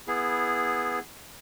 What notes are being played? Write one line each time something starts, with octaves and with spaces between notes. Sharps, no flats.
B3 E4 G#4